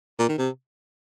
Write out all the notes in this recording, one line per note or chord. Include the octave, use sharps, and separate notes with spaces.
A#2
D#3
C3